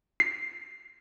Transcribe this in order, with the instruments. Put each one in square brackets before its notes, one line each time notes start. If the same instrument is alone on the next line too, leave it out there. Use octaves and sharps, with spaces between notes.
[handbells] C7